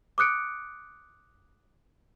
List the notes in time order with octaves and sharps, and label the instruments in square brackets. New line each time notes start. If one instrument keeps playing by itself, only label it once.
[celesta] D6 D#6 F#6 C#7 D7